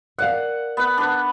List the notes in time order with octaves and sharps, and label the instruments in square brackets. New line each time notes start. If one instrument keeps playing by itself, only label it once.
[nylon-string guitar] A#4 D5 F5 [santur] F#5
[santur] B3 F#5
D4 B4